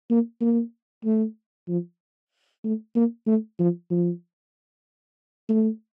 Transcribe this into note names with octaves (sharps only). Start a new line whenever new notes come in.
A#3
A#3
A3
F3
A3
A#3
A3
F3
F3
A3